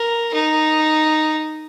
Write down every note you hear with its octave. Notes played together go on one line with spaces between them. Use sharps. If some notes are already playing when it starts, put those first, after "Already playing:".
Already playing: A#4
D#4